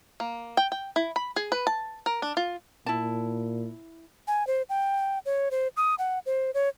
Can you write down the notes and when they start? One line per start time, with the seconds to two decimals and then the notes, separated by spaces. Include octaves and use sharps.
0.20 A#3
0.57 G5
0.72 G5
0.96 E4
1.16 B5
1.36 G#4
1.52 B4
1.67 A5
2.06 A#4
2.22 D4
2.37 F4
2.86 A#2 E4 A5
4.28 G#5
4.47 C5
4.69 G5
5.26 C#5
5.51 C5
5.77 D#6
5.99 F#5
6.26 C5
6.54 C#5